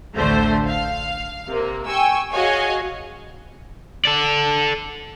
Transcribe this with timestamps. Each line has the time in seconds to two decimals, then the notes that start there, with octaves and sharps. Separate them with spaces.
0.15 A1 D2 D3 A3 C5
0.68 F5
1.49 C3 A#3
1.88 G5 G#5 C#6 E6
2.33 F#4 G#4 C#5 D#5 F5 G#5
4.05 A4 D5